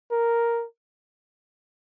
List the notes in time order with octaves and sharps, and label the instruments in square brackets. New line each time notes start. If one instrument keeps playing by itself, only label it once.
[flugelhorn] A#4